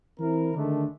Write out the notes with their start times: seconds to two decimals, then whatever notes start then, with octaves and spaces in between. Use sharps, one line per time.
0.20 E3 C4 E4 A#4
0.56 D3 D#3 G#3 A3 D4